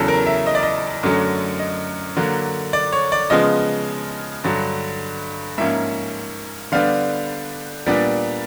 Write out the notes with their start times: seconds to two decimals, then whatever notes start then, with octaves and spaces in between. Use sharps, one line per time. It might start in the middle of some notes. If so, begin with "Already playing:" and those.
Already playing: E2 C#3 F#3 A4
0.08 A#4
0.26 E5
0.47 D#5
0.55 D5
0.63 D#5
1.03 F#2 D3 F#3 A3 C#4
1.59 D#5
2.17 D3 F#3 A#3 D4
2.73 D5
2.93 C#5
3.12 D5
3.30 C#3 F3 G#3 B3 D#5
4.44 G2 D3 F#3
5.58 G#2 F3 A#3 C#4 E5
6.72 D3 G3 B3 D4 F5
7.86 A#2 G3 B3 D4